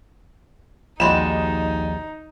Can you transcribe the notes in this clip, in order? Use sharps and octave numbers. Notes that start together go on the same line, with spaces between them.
A#1 D#2 G3 G#3 D#4 F#4 E7